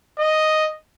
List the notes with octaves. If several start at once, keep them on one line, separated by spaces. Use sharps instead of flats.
D#5